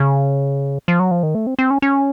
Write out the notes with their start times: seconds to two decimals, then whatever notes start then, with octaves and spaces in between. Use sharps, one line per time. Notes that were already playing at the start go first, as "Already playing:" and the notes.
Already playing: C#3
0.88 F3
1.00 F#3
1.11 F3
1.23 D#3
1.35 A3
1.47 C4
1.59 C4
1.71 C#4
1.82 C#4